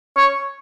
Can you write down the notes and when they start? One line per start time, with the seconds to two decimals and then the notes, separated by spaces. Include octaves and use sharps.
0.17 C#5